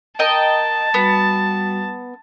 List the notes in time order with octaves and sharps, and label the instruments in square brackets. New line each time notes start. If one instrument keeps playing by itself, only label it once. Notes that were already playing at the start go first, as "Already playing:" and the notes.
[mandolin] A#4 D#5 G5 [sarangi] A5
[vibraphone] G3 F#4 [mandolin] B3